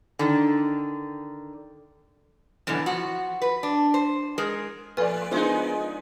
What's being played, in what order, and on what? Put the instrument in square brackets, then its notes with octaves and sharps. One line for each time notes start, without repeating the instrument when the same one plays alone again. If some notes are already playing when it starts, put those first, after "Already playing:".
[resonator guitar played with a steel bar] D3 D#3
F#2 B2 D3 E3
F3 F#4
B4
D4
C5
G#3 G#4 A#4
[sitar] A2 [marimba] F3 A4 F6 [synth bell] B4 D5
[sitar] G#3 D#4 [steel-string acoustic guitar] B3 F4 C5 [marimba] D4 G#4 A#4